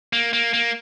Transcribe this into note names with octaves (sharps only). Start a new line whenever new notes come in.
A#3
A#3
A#3